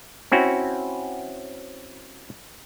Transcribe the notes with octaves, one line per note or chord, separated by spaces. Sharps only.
C4 C#4 E4 F#4